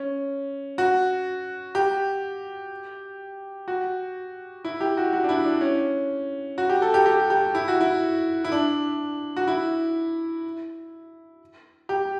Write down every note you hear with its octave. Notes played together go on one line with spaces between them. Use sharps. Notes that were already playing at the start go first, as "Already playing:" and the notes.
Already playing: C#4
F#4
G4
F#4
E4
G4
F#4
F#4
D4
E4
D4
C#4
F#4
G4
A4
G4
G4
G4
E4
F#4
E4
E4
D4
F#4
E4
G4